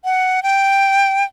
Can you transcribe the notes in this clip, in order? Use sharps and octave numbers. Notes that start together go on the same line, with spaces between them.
F#5
G5